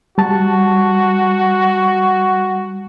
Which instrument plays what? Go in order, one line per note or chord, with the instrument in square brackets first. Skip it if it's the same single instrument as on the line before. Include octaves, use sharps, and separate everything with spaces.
[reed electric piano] G3 A5 [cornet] F#4